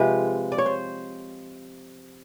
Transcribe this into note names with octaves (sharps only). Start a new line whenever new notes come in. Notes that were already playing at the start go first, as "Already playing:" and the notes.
Already playing: C3 F3 G#3 B4
D5
C#5
C5